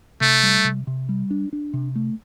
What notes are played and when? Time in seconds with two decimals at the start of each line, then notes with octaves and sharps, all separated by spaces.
0.21 C3 A3
0.43 G3
0.65 C3
0.87 C3
1.09 G3
1.30 D4
1.53 D4
1.73 C3
1.95 A3